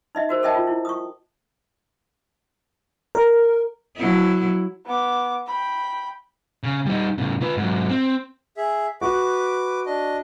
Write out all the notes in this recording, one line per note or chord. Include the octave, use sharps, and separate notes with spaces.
D#4 D#5 E5
F#4 A#4 C5
A4 A#4 D#5 E5 G5 A5
F4
E4
C#6 D#6
A#4
F#3 E4
B3 D6
G5 B5
C#3
G3 D#4
A2 C#3
F4 B4
G#2 F#3
C4
G#4 E5
F#4 B4 D6
D4 D#5